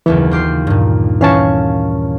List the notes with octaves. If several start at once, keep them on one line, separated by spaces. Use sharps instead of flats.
F#1 D#2 E3 B3
F4 G4 C7
G2 A#2
E3 C#4 C#5 F5 A5